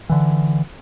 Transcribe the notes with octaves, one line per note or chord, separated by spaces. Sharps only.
D3 E3